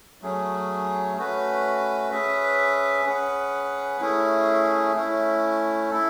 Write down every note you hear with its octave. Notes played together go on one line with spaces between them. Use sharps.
F#3 A3 C#4 G#4
A3 C#4 F#4 B4
C#4 G#4 B4 E5
C#4 G#4 B4 F#5
A3 C#4 E4 G#4
A3 C#4 E4
E4 A4